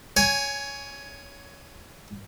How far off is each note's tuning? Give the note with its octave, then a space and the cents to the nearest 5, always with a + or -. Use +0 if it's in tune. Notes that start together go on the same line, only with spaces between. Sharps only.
C#5 +15 G#5 +0